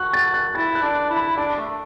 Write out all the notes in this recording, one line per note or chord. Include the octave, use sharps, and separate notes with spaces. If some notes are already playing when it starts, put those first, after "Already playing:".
Already playing: F#4 F#6
A6
F#6
E4 A6
F#6
D4
E4
B5
D4 A5
A3